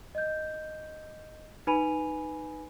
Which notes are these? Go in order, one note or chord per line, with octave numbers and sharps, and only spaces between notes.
D#5 G6
D#4 B4 G#5 B5 D#7 F7